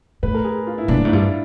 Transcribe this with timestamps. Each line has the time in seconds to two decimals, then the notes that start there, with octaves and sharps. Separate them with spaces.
0.23 A2 B4
0.34 A#4
0.44 G#4
0.67 F4
0.78 E4
0.88 A#2 D4
0.97 A2
1.04 G#2 E4
1.13 G2 F4